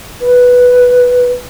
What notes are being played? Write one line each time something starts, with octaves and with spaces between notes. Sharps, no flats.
B4